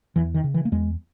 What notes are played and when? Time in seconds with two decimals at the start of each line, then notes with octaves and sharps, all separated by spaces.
0.16 E2 E3
0.34 D#3
0.44 C#3
0.54 E3
0.65 A#3
0.72 E2 G#3